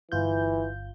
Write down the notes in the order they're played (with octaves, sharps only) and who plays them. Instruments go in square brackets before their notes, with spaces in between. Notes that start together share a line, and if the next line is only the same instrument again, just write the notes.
[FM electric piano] G1 F4 G6 [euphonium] E3